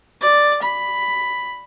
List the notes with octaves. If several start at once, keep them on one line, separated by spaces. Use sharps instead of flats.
D5
B5